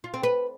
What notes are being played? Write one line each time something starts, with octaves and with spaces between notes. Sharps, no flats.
F4
C4
B4